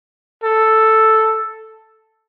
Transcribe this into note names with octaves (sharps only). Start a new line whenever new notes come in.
A4